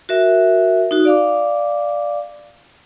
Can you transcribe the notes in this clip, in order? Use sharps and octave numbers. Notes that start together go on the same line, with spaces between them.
F#4 A#4 E5
D#4 F#4 D#6
D5 F5 D6